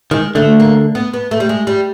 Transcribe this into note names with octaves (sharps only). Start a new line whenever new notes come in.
D#3 G#3
D3 A3
A#3
B3
B3
A3
G3
G#3
G3